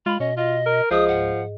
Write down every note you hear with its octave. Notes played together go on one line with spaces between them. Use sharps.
G#3 F4 B5
B2 C#4 D#5
F4 D#5
A#4
C#2 F3 G#4 D#5 D#6
G#2 F#5